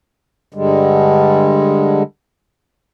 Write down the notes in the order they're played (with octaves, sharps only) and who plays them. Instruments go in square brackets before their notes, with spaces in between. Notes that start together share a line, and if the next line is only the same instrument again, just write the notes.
[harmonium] G2 D3 G3 G#3